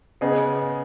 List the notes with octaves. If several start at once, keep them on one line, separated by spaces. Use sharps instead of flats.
C#3 B3 G#4 D#5